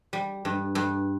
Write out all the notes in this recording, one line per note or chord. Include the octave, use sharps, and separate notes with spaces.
G3
G2
G2